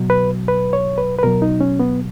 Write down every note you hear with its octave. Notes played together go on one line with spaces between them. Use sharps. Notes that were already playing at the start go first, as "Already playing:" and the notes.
Already playing: B2 F#3
B4
B4
C#5
B4
B4
B2 F#3 A#4
D#4
C#4
B3